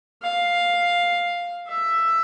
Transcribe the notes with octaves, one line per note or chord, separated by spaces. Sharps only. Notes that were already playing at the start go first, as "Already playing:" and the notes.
F5
E5